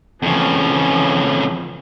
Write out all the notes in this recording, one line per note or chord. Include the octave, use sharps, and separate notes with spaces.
F2 C#3 E3 F3